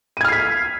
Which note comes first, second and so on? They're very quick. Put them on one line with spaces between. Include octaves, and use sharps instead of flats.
D#7 G#6 F6 C7 B6